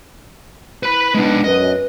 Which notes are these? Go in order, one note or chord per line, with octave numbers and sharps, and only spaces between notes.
E4 B4 B5
G#3 B3 D4 D#4
F#2 B4 D#5